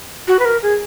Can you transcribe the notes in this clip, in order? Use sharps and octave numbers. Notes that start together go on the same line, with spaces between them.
F#4
B4
A#4
G#4